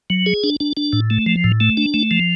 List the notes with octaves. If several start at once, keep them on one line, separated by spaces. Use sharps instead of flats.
F#3
G#4
D4
D4
D4
A2
A3
F3
A2
A3
D4
A3
F3